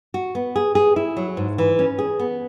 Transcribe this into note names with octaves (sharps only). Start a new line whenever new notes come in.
F#4
B3
G#4
G#4
E4
F#3
G#2
E3
C#4
G#4
B3